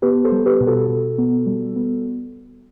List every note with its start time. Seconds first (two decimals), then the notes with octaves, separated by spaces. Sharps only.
0.02 B3 G4 B4
0.25 A4 C5
0.32 G3
0.46 G4 B4
0.61 B2
0.67 F#4 A4
0.89 B2
1.18 B3
1.46 G3
1.76 B3